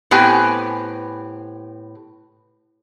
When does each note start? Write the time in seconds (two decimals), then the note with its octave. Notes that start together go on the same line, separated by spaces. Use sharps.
0.11 A2 B3 C4 G4 B4 G#5